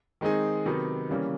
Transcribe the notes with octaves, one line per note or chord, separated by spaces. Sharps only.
D#3 G#3 C4 D#4 G#4
C3 D#3 F#3 B3 D#4
C#3 E3 G3 A#3 C#4